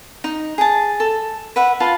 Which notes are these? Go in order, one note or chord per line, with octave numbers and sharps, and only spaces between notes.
D#4
G#4 A5
A4
B4 E5 F#5
F4 B4 A5